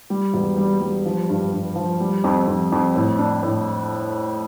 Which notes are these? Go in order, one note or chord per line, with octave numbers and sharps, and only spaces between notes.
G3
E1
G3
G3
F3
G2
G2
F3
G3
F2
F2
F2
A2
D4
A2